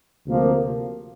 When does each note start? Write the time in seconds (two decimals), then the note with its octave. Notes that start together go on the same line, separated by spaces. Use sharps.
0.27 D2 C3 F3 A#3